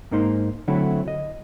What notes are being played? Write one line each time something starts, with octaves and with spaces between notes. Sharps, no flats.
G#2 A#3 D#4 C5
D3 F#3 A3 C4 E4
D#5